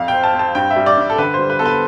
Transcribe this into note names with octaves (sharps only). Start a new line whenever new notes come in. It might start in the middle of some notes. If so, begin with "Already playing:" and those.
Already playing: F2 F5
C4 G5
A5
C4 A5
G2 G5
E5
G3
D5
G2
A4
D3 B4
G3 C5
B4
B3 A4
B4